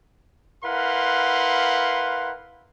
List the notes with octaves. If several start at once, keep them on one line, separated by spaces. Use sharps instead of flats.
E4 A#4 B4 F5 F#5 C6